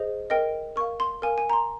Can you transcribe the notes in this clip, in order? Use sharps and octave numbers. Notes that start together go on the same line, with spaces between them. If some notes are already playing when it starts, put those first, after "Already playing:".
Already playing: G#4 C5 D#5
A#4 D#5 G5
A#4 F5 C#6
C6
A#4 F5 G#5
G#5
A#5
C6